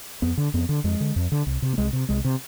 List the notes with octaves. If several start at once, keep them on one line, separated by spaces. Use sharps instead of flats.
F2 B3
D3
F2 B3
D3
F2 G#3
D3
F2
D3
C2
C3
B3
C2 G#3
C3
C2 G#3
C3